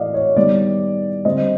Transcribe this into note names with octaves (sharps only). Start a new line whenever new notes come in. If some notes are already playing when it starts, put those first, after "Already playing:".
Already playing: A2 E3 A3 D5 D#5 F5
C#5
D#3 G3 B3 D5
D3 G3 C4 D#5